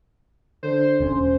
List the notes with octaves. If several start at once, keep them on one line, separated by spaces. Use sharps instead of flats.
D3 C5
E1 C#4